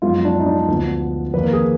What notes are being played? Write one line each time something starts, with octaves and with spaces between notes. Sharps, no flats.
F#2 F3 G#3 B3 F4
D4
D#4
D4
D2 D3 F3 B3
F2 D#3 A#3 B4
A#4
G#4